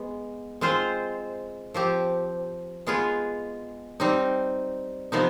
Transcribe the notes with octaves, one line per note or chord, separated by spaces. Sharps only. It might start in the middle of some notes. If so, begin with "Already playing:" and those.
Already playing: G#3 B3
G#3 C4 F4 C5
F3 C4 G4
G#3 B3 F4 G#4
G3 C4 D#4
C3 F3 B3 D#4